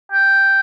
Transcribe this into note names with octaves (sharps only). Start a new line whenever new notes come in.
G5